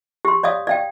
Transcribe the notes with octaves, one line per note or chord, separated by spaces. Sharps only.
G4 C6
C#5 D5 F5 D#6
D5 F5 G5